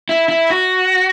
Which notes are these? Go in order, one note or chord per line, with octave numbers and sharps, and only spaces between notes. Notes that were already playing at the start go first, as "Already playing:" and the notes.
E4
E4
F#4